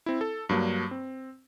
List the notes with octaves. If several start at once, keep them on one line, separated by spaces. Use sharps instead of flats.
C4 E4
A4
G2 F#3 A#3 D4
C4